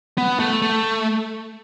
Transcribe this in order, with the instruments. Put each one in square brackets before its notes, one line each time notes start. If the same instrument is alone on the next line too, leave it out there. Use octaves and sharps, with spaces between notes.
[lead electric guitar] B3
A3
A3